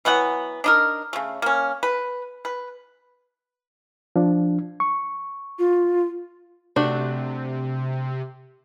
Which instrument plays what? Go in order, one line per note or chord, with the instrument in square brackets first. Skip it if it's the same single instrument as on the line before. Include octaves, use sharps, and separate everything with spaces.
[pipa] E3 F#3 B3 F#5
D4 D#4 A#4
C#3 A3
A#3 C#4
B4
B4
[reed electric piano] F3 D4
C#6
[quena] F4
[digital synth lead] C3 [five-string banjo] A3 D4 F#4